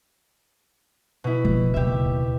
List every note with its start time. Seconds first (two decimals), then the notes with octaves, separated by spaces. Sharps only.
1.24 B2 E4
1.45 F#1 F3
1.74 D#2 C#3 G4 E5